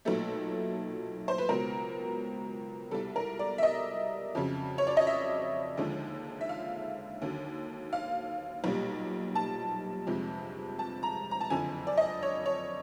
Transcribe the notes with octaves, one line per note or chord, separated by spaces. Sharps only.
B1 A#2 F#3 A3 A4
C5
B4
C#2 B2 F#3 A#4
C2 B2 G3 A4
A#4
D5
E5
D#5
F2 C#3 F#3
C#5
D5
D#5
E5
D#2 D3 F3 G#3
E5
F5
D#2 D3 F#3
F5
B1 A#2 G3
A5
G1 F2 C3 F3 G#3
A5
A#5
A#5
A5
F#1 F2 D3 F3 G#5
D5
D#5
C#5
C#5